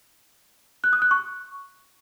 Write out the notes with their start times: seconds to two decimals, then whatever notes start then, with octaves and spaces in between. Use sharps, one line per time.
0.84 F#6
0.93 D#6
1.02 F#6
1.11 C#6